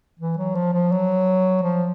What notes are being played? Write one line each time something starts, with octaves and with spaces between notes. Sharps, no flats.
E3
F#3
F3
F3
F#3
F3